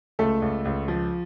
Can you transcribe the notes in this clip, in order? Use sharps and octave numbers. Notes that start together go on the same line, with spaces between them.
C#2 A3 A4
C#2
C#2
F3